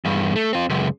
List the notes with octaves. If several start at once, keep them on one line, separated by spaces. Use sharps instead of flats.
E2 G2
A3
C4 F4
C#2 F#2